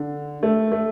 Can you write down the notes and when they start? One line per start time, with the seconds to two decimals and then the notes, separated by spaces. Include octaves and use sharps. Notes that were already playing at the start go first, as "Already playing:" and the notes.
Already playing: D3
0.43 A3
0.72 A3